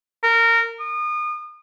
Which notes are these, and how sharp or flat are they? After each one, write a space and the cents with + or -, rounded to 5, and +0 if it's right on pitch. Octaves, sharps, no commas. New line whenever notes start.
A#4 -20
D#6 -35